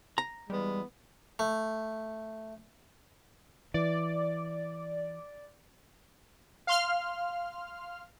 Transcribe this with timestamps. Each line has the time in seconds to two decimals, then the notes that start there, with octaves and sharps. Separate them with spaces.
0.18 A#5
0.50 E3 G3 G#3 B3
1.39 A3
3.74 E3 D5
6.67 F5 C6 F6